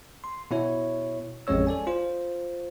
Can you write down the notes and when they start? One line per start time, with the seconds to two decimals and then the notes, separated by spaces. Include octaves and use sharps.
0.24 C6
0.51 B2 E4 C#5
1.47 A1 F2 G#3 C#4 C#5 E6
1.67 A4 D5 G#5
1.87 F4 C5